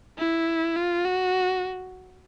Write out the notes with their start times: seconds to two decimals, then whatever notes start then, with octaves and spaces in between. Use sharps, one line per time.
0.19 E4
0.77 F4
1.05 F#4